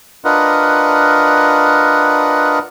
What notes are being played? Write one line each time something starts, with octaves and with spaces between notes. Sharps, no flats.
D4 F4 A#4 B4 D#5 F#5